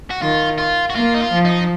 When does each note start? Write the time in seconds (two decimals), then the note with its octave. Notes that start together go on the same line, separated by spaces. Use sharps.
0.10 F#4
0.22 D#3 F4
0.58 F4
0.90 F#4
0.95 A#3 F4
1.14 D#4
1.21 F4
1.33 F3
1.45 D#4